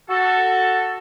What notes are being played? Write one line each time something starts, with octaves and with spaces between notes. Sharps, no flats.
F#4 A4